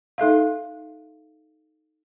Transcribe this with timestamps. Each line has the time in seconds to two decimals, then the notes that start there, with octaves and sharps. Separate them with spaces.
0.18 D#4 A4 E5 F5